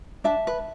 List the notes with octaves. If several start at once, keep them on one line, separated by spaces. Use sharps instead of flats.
D4 E5 A5
B4